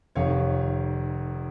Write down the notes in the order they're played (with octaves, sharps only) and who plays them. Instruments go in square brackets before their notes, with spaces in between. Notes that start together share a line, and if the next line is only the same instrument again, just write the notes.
[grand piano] F1 F2 D#3 C#5 F5